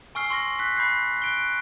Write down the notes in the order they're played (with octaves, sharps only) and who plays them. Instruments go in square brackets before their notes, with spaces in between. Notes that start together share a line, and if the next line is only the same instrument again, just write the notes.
[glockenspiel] G#5 C#6 E6 F6 C7 G7
C6 C#6 A#6
F#6 B6
B5 G6 C7
F#6 D7 G7